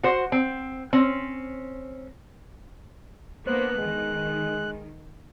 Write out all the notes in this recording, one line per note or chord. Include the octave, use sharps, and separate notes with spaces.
F#4 C5
C4
C4 C#4
A#3 B3 D4 C5 F#6
D#3 G#3